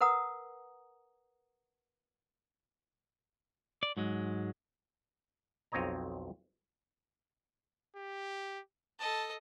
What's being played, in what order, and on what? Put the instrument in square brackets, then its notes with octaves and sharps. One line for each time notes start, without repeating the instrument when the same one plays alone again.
[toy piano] A#4 B4 F#5 A#5 D#6
[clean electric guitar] D5
G#2 F#3 G#3
[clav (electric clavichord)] B1 F2 C4 C#5 D#5 A#5
[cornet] G4
[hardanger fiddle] A4 D#5 [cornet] A5